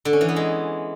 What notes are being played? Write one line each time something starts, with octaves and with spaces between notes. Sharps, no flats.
D3
C#4
E3
B3
G#3